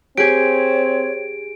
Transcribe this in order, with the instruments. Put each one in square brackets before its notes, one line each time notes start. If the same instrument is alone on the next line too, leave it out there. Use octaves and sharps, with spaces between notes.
[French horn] C4 [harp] G4 G#4 [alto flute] C#5 [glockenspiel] D7